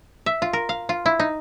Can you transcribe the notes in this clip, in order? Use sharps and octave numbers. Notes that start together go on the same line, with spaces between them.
E5
F4
A#4
F5
F4
E4
D#4